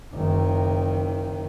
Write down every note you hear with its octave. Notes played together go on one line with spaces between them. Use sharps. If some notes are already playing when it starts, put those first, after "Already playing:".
F#1 D#3